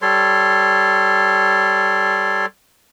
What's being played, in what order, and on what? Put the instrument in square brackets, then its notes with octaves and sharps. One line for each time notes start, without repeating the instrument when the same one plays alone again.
[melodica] G3 A4 C#5 C6